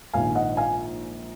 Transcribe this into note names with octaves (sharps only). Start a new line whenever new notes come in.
A#1 G#2 D#3 F5 G#5
D#5 F#5
F5 G#5